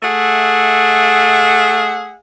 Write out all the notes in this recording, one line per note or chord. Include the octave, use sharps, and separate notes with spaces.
A3 G#4 E5 F#5